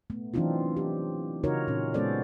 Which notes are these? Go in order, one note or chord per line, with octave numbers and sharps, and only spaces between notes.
A3 B3
E3 F#3 C4 D4 D#4 F4
G4
C#3 D#4 F4 F#4 A#4 C#5
A#2 C#4
G#3 B3 C#4 A4 C5 D5